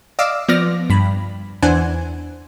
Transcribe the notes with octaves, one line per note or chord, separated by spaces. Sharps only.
D5 D#5 F5 D6 E6
F3 B3 D5 D6 F6 A#6
G2 B5
E2 E3 D4 C5 F#5 G#5